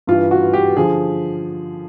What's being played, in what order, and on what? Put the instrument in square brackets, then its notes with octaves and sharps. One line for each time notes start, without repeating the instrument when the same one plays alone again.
[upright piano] G2 E3 F4
F#4
G4
D3 F3 G#4